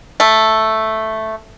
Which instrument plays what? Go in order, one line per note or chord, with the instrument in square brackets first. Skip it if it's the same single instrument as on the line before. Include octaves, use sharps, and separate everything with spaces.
[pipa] A3